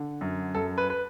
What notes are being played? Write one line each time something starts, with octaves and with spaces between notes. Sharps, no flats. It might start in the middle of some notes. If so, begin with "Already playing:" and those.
Already playing: D3
F#2
F#2 A4
B4
B4